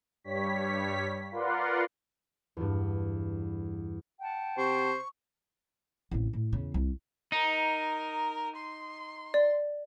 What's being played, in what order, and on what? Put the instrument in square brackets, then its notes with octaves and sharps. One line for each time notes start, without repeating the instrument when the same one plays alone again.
[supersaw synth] G2 G3 C#5 B6
F4 A#4 B4 D5 F#5 C6
[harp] E2 G2
[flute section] F#5 G5 A5
[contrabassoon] C3 [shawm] C5 [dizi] C#6
[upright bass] A1 C3
A2
E2 C#3
C2
[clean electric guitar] D#4 [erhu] A#4
[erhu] C6
[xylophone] D5